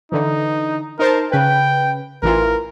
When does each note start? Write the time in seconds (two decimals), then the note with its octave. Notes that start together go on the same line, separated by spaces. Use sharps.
0.12 D3 E3 D#4
0.99 D#4 A#4 C5 A5
1.32 C#3 B4 G5
2.23 A1 E3 F4 A#4